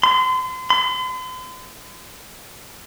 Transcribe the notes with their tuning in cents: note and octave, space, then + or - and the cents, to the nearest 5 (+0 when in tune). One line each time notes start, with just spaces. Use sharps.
C6 -35
C6 -45